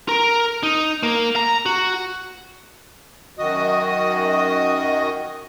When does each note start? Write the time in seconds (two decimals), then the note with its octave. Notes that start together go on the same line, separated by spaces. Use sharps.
0.09 A#4
0.63 D#4
1.03 A#3
1.36 A#5
1.66 F#4
3.39 F#2 D#3 F#4 D#5 D#6